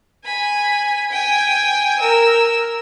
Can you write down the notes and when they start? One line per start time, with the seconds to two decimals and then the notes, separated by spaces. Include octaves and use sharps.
0.24 G#5 B5
1.11 G5 G#5
1.99 A#4 E6